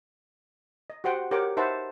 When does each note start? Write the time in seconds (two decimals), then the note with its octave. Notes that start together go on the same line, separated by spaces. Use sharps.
0.90 D#5
1.04 F#4 G4 C5 F#5 G5
1.31 G4 A#4 C#5 F#5 G5 D6
1.57 D#4 B4 C5 E5 F#5 A5